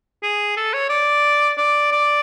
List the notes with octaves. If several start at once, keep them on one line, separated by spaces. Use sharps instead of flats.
G#4
A4
C#5
D5
D5
D5